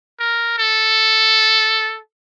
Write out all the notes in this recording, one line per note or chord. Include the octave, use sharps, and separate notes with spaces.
A#4
A4